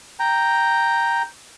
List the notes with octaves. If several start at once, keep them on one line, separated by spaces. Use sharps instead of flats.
G5 A#5